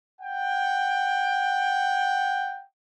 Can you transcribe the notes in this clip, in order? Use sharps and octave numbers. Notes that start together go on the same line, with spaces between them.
F#5 G5